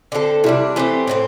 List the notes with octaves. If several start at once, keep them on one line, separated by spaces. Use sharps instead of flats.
D3 C4 A4
C3 G3 D4 E4
E3 A3 C4 E4 G4
A2 A3 C4